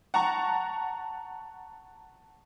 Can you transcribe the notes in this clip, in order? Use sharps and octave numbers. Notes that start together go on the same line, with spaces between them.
F#5 A5 A#5 C#6